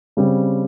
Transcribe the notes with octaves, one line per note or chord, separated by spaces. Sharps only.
C#3 G3 C4